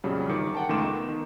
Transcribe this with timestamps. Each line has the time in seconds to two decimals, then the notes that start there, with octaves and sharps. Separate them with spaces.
0.04 A#1 F2 C#3 F#3 G3
0.30 G1 D#3 D6 C#7
0.55 F#5 G5 A5
0.69 C#2 D#3 A3 C6 D6 E7
0.84 B3 D#4
1.08 D#3